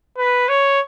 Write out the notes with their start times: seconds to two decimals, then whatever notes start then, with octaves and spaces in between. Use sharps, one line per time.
0.18 B4
0.48 C#5